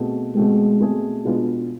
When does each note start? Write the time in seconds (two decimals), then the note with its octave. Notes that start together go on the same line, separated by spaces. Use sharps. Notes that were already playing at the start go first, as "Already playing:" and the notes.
Already playing: B2 A3 C4 G#4
0.35 B2 G#3 A3 C4 G#4
0.80 B2 A3 C4 G#4
1.25 B2 G#3 B3 D4 F4